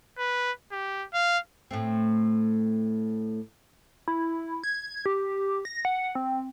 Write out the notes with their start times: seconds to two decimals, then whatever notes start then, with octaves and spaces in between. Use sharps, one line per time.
0.18 B4
0.72 G4
1.14 F5
1.71 A2 A3 C4
4.08 E4
4.64 G#6
5.06 G4
5.65 A#6
5.85 F#5
6.15 C4